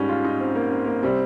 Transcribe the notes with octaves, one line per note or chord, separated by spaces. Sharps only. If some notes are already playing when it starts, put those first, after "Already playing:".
Already playing: G#2 G3 C#4
F4
D#4
C4
A#3
C4
A#3
C3 G3 C4